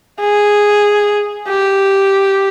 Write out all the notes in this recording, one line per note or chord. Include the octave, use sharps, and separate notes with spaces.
G#4
G4